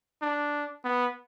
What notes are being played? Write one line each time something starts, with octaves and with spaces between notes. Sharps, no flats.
D4
B3